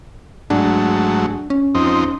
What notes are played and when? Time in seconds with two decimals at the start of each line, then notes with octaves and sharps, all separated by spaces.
0.50 G#2 F#3 A3 D4
1.50 C#4
1.75 F2 C4 D#4